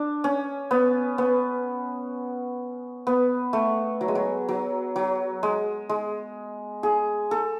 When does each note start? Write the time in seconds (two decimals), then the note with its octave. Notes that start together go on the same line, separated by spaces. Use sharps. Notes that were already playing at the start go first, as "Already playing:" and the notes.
Already playing: D4
0.24 C#4
0.71 B3
1.18 B3
3.07 B3
3.53 A3
4.01 F#3
4.08 G#3
4.15 F#3
4.48 F#3
4.96 F#3
5.43 G#3
5.89 G#3
6.83 G#4
7.31 A4